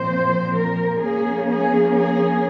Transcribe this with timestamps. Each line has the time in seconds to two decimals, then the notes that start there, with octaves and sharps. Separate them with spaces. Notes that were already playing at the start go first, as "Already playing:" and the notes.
Already playing: A#2 F3 C4 C5
0.55 A#4
1.01 F3 A#3 C#4 G#4
1.49 G#4
1.96 G#4